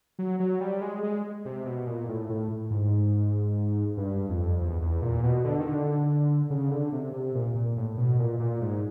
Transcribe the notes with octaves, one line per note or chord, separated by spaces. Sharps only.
F#3
F#3
G3
G#3
G#3
C3
B2
A#2
A2
A2
G#2
G2
F2
E2
E2
A#2
B2
D3
D#3
D3
C#3
D3
C3
C3
A#2
A#2
A2
B2
A#2
A#2
G#2